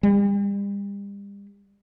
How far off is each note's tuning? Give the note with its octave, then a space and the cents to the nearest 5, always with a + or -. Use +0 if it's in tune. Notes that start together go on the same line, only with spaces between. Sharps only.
G3 +40